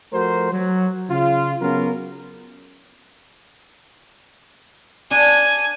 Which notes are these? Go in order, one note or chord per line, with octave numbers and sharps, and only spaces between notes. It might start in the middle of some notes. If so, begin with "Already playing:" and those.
F3 A3 F#4 A#4 C5
F#3
C#3 F4
C#3 F#3 B3 C#4 F4 A#4
D4 G#5